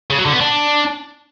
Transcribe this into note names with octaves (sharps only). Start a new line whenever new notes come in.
C#3
F#3
D3
B3
D4